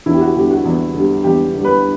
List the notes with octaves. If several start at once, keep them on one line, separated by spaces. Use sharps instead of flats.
E2 E4
G4
F#4
D3 G3 G4
F#4
E2
D3 G3
E2 G4
D3 G3
B4